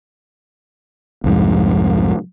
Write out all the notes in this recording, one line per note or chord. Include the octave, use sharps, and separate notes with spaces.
C2 F2 G#2